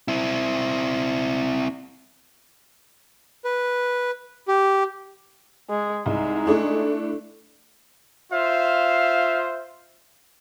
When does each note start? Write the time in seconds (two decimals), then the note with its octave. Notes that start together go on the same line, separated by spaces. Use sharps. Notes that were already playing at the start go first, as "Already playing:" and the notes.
0.08 C4 E4
3.45 B4
4.48 G4
5.70 G#3
6.06 C2 G#3 D#4
6.46 A3 D4 E4
8.31 F4 C5 E5 F5